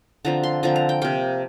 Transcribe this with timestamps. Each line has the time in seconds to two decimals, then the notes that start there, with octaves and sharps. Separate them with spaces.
0.25 D3 F3 C4 A#5
0.43 C6
0.63 D3 F3 C4 A#5
0.76 A#5
0.89 G5
1.02 C3 A#3 G5